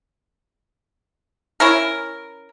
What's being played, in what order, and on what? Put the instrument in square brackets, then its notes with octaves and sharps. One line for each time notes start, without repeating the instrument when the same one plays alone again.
[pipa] C#4 E4 A#4